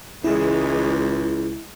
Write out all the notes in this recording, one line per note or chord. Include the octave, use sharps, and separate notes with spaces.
C#2 E3 G#3 E4